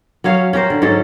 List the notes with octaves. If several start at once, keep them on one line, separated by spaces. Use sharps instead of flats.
F#3 C#4 C#5 F5
C#4 G4 A#4 C5
D3
G#2 F#3 C#4 A4